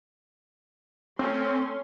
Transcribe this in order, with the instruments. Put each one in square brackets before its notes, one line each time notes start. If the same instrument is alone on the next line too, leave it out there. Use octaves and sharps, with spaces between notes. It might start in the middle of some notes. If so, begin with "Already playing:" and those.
[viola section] A3 C#4 C6 [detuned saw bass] C4